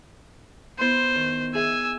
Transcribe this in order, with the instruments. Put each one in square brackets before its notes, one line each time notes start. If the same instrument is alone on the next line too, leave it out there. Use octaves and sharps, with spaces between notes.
[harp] B3 E4 C6 [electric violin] C5
[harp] D#3
[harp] G#4 E5 [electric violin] G#5 E6